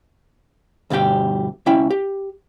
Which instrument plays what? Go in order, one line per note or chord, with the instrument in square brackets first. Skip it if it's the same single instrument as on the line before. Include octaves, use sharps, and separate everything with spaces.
[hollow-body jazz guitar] D2 G2 B2 G4 G5
C#2 C#4 E4 G5
G4